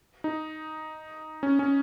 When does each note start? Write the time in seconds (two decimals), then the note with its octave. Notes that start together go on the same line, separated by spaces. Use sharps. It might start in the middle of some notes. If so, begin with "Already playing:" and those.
0.24 D#4
1.43 C#4
1.59 C#4